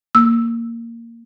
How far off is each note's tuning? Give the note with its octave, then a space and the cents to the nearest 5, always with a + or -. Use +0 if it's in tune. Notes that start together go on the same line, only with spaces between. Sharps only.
A#3 -10 E6 +0